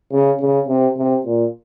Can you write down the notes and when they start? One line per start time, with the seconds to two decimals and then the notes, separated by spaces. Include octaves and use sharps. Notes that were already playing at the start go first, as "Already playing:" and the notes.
0.12 C#3
0.40 C#3
0.68 C3
0.97 C3
1.25 A#2